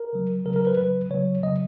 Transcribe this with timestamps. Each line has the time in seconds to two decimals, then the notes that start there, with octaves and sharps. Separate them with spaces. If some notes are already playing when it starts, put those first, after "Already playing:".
Already playing: A#4
0.13 C#3 F#3
0.45 C#3 F#3 A#4
0.56 A#4
0.67 B4
0.77 C#3 F#3 B4
1.10 C#3 F#3 C#5
1.43 C#3 F#3 D#5